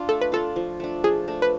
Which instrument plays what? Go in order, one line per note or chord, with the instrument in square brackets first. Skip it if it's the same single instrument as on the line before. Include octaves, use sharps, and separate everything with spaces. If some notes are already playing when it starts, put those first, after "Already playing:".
Already playing: [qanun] D4 F4
[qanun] A3 [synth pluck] A4
[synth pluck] B4
[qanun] D4 F4 [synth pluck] A4
[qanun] F3
A3 D4
[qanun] F3 [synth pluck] G#4
[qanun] A3 D4
[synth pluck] B4